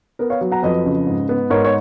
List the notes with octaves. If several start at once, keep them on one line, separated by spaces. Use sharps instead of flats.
B3 A#4
C#5 F5
F#3
F#5 A#5
F2 B4 D#5
C#3
G#2
B3
G#2 A#4 C#5
C#5